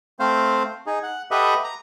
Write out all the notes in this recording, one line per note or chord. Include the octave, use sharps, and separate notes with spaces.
A3 C4 C5 F5
D#4 G#4
F#5
G4 A4 B4 D#5 E5 F#5
A#5